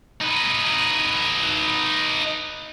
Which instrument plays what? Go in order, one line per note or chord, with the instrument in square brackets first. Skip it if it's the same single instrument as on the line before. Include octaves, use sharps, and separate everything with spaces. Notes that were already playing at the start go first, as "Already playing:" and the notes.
[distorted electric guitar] D#4 B4